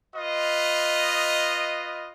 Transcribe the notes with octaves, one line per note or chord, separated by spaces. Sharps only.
F4 B4 D#5